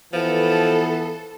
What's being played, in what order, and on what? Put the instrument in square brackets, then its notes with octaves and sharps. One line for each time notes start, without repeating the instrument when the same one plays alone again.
[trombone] E3 [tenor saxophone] F3 [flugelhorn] B3 [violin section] A4